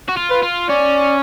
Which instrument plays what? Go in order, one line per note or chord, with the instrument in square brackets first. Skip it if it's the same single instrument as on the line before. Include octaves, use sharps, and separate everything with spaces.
[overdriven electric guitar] F#4
F4
[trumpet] B4
[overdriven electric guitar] F4
[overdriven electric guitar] C#4 [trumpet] D5